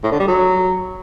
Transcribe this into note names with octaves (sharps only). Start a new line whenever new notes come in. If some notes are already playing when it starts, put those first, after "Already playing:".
A2
D3
G3
F#3